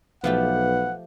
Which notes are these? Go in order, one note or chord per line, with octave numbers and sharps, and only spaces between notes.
B1 F3 A3 G4 B4 F#5